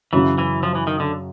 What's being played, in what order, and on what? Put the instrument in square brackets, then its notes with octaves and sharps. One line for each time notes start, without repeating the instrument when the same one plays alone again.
[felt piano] F#2 C#3 F#3 [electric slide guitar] E3
[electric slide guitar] E3
F3
E3
D#3
D3